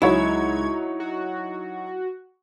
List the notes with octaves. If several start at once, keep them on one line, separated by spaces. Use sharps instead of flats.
C#2 F#3 G#3 D#4 E4 C#5 G#6
F#4